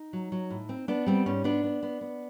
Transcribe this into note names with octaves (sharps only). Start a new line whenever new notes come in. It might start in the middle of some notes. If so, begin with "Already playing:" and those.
Already playing: D#4
F#3
F#3
A2
C4
B3 D4
G3 C4
G#2 C#4
B3 D4
B3
B3
B3